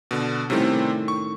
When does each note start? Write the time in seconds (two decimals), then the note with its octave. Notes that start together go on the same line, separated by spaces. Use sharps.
0.11 B2 D3
0.50 A2 C3 D#3 G3 C4 C#4
1.08 C#6